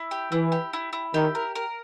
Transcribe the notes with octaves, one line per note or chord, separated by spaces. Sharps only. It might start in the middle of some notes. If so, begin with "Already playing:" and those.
Already playing: E4
G4
E3 E4
G4
E4
E4
D#3 G4
A#4
A#4